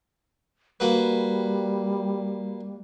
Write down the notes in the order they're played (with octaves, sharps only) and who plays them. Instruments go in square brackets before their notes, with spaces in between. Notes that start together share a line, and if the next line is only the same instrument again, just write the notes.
[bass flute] G3 [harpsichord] A#3 F#4 B4